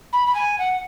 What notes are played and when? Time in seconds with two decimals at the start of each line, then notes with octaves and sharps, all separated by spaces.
0.12 B5
0.27 B5
0.34 G#5
0.58 F#5